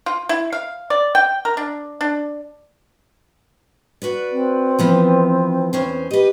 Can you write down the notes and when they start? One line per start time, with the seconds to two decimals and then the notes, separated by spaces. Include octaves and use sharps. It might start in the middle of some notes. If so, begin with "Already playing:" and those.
0.06 F4
0.29 E4
0.53 F5
0.90 D5
1.15 G5
1.45 A#4
1.57 D4
2.01 D4
4.02 F#4 B4 D5
4.31 C4
4.79 E3 F3 B3
5.73 E2 C#4 C5
6.11 G4 B4 D#5